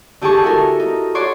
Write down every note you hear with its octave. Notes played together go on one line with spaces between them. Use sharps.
D3 G4 G#4 A5 C#6
E4 F#4 A4 A#4
D#4
F#4 C#5 D5 C6 D6